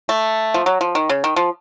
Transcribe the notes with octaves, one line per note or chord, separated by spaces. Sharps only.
A3
F3
F#3
F3
D#3
C#3
D#3
F3